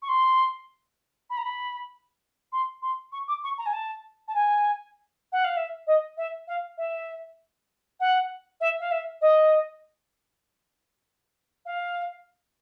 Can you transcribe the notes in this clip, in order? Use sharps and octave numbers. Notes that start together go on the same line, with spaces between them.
C#6
C6
B5
A#5
B5
C6
C6
C#6
D6
C#6
A#5
G#5
A5
A5
G#5
F#5
F5
E5
D#5
E5
F5
E5
F#5
E5
F5
E5
D#5
F5